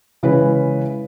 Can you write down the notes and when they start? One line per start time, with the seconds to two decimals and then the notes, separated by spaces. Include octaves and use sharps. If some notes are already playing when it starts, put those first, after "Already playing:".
0.23 C#3 E3 G#3 C#4 B4